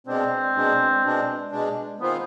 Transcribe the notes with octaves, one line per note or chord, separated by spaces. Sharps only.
B2 G#3 C4 D4
B2 G#3 D4
B2 G#3 D4
B2 G#3 D4
D#3 G#3 B3 C4 F4 C5